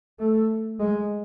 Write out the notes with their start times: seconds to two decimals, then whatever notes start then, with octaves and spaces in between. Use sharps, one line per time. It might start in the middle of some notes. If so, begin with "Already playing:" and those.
0.20 A3
0.80 G#3